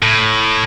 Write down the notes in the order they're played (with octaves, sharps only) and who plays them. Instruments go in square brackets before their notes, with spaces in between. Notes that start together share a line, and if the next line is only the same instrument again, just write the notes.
[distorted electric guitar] A2